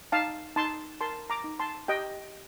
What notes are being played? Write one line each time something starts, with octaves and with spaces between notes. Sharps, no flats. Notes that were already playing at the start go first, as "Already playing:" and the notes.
D#4 F5 A5
D#4 A5 C6
A#4 A5 C6
A#5 D6
D#4
A5 C6
G4 D#5 G5